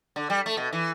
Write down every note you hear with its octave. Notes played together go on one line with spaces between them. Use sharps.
D3
G3
A3
B2
E3